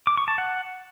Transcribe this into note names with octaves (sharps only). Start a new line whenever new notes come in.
D6
C#6
A5
F#5